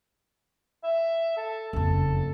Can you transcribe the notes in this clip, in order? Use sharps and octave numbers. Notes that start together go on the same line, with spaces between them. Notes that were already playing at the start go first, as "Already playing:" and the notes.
E5
A4
F#1 F2 A4